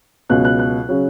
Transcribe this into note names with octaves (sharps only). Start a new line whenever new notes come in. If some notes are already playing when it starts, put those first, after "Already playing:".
C#2 B2 F#3 F#6
F#6
F#6
C#3 F#3